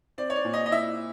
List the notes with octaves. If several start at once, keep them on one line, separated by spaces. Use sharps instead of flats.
C4 D5
C#5
D5
A#2
D#5
D#5
E4 E5